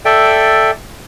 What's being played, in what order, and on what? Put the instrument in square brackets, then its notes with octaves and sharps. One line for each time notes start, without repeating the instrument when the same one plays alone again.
[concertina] A4 D5 E5 G5